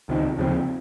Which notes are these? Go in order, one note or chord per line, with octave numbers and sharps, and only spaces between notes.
C#2 C3 D#3
D#2 C#3 F3 C4